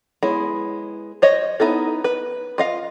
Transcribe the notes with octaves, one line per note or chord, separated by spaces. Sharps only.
G#3 B3 E4 C#5
C5 C#5 D#5
B3 D#4 E4 A4
B4
F4 D#5 F5